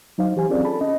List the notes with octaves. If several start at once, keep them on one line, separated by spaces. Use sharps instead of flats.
F#3 D#4 C5 F5
E3 G4 C5 G#5
C4 C#4 F4 G#4 A#4 D5
A4 A5 B5
C#4 D#5